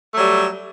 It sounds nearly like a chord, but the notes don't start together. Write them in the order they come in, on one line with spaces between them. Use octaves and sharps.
A3 F#3 G3